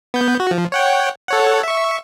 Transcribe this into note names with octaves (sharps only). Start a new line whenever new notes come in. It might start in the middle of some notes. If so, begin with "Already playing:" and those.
B3 G6
F#4
F3
C#5 F#5 G5
A4 C#5 F#5
E5 C#6